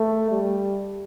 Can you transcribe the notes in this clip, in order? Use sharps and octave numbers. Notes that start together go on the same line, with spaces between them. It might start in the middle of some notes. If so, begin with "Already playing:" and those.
Already playing: A3
G3